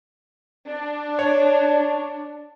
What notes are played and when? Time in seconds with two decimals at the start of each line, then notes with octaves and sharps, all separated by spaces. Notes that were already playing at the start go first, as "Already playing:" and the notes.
0.68 D4
1.19 C#5